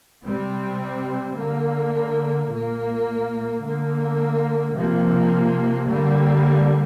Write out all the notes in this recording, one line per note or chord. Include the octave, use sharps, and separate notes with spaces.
C3 G3 C4
D3 A#3
A#2 A#3
D3 A#3
C3 F3 A#3
D3 G3 A#3